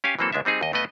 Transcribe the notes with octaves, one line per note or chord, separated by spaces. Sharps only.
C#4 G4 F5 G#5
E3 F#3 A#3 C4 A4
C#2 G#3 D4 E5
G3 C4 D#4 G#4
D#2 D#5
G2 A3 B3 B4 D#5